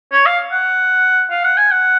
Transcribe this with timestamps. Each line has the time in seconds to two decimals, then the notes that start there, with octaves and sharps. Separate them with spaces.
0.12 C#5
0.26 F5
0.52 F#5
1.31 F5
1.44 F#5
1.57 G#5
1.71 F#5